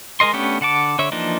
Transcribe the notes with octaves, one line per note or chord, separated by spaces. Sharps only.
G#3 A#4 D#5 C6
A3 B3 C#4 D4 G4
D3 F#5 A5 D6
D3 C#5 E5
E3 F3 A#3 D4 D#4